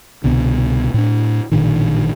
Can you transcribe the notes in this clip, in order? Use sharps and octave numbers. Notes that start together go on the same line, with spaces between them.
C2 B2 D3
A2 D4
A1 A#2 D3 D#3